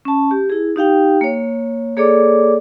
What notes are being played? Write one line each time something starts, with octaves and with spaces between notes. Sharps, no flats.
C#4 A5
G4
E4 G#4
D#4 G4 F5 G5
A#3 C#5
A#3 G#4 A4 C#5 D5 D6